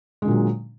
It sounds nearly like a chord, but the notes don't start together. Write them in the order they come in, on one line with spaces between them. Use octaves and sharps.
G#3 D3 A#2 F#3